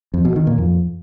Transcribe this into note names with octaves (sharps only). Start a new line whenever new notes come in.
F2
B2
D#3
A#2
F2